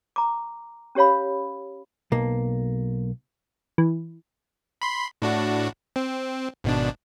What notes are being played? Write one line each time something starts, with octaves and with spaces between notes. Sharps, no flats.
A#5 D6
C#4 G4 C#5 F5 B5
B1 A#3
E3
B5 C6
A2 D4 F#4
C4
G#1 B2 D4